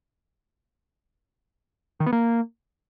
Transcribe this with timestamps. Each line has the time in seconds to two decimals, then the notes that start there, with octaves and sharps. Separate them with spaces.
2.00 D#3
2.06 B3
2.13 A#3